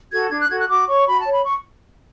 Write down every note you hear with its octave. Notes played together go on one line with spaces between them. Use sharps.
F#4 A4 G#6
D4 G#6
F#6
F#4 A4 G#6
F#6
F#4 D6
C#5 C#6
F#4 B5
A5
C#5
B5
C#6